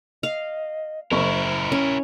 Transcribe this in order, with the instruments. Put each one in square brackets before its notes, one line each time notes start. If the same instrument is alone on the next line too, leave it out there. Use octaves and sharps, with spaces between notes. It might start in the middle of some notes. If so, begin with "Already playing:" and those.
[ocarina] D#5 [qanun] F5
[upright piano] F#1 C#6 [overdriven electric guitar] E4 A#4 [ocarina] C5
[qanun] C#4